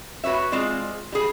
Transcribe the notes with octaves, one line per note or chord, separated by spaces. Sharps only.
F#4 B4 C#5 E5
G#3 C4 F4 D5
G3 G#4